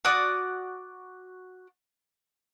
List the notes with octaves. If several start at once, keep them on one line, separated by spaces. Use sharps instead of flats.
F#4 D5 D6 D#6